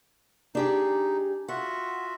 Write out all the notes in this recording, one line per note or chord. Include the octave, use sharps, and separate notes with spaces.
D4 D#4 G4 G#4
F4 F#4 E5 F#5